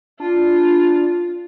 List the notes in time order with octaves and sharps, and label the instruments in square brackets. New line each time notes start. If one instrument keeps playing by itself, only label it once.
[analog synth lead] D4 [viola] F4